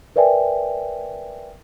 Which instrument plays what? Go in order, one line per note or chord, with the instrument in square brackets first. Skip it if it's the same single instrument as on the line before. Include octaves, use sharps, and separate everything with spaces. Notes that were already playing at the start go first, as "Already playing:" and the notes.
[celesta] A#4 B4 D5 E5 G5 G#5